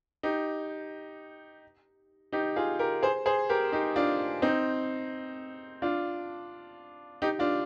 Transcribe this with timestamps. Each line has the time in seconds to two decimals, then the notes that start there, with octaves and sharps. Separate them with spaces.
0.23 D#4 G4
2.33 D#4 G4
2.56 F4 G#4
2.79 G4 A#4
3.02 G#4 C5
3.26 G#4 C5
3.49 G4 A#4
3.72 D#4 G4
3.96 D4 F4
4.42 C4 D#4
5.82 D4 F4
7.22 D#4 G4
7.39 D4 F4